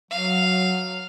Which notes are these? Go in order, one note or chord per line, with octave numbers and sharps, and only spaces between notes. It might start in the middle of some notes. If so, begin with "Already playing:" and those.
F#3 F5